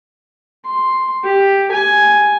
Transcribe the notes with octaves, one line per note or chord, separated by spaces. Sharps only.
C6
G4
G#5